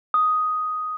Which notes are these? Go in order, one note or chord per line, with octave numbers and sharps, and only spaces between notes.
D#6